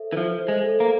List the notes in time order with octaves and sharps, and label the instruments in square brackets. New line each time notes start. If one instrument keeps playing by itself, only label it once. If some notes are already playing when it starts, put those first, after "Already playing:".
Already playing: [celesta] A4 C5 E5
[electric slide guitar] E3
[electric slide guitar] F3 [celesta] E5
[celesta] C5
[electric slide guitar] G#3
[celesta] A4
[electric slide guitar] A#3